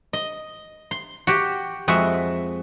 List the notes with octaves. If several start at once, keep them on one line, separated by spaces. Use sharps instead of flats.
D#5
C6
F#4 G4
F2 G#3 F#4 E5